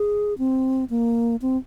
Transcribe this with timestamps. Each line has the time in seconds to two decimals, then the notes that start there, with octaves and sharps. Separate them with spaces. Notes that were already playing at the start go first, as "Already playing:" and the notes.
Already playing: G#4
0.38 C4
0.90 A#3
1.42 C4